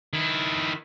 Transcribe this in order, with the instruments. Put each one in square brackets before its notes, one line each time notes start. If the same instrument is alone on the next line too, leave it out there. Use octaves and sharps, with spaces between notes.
[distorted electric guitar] D#3 E4